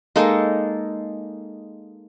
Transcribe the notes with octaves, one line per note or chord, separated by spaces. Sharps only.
G#3 A#3 D#4 A4